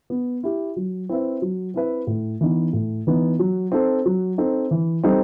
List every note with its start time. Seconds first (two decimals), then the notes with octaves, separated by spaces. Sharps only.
0.10 B3
0.43 E4 G4
0.76 F#3
1.09 C4 E4 B4 E5
1.42 F#3
1.74 C4 E4 B4 E5
2.07 A2
2.41 E3 B3 D#4
2.73 A2
3.07 E3 B3 D#4
3.39 F#3
3.72 C4 D#4 A4
4.06 F#3
4.38 C4 D#4 A4
4.71 E3
5.03 G3 C4 D#4 A4